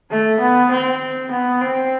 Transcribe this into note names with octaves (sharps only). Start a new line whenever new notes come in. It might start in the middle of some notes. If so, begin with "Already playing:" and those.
A3
B3
C4
B3
C4